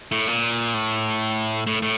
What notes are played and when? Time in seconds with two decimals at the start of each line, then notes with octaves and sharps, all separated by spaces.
0.12 A2
0.28 A#2
0.74 A2
1.67 A2
1.82 A2